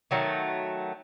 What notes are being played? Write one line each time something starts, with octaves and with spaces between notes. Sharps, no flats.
D#3 F#3 A3